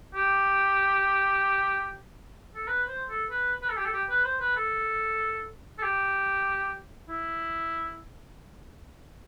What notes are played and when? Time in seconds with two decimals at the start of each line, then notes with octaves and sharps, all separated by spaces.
0.14 G4
2.55 A4
2.67 B4
2.88 C5
3.10 A4
3.30 B4
3.62 B4
3.69 A4
3.77 G4
3.85 A4
3.93 G4
4.10 B4
4.24 C5
4.41 B4
4.56 A4
5.78 A4
5.83 G4
7.09 E4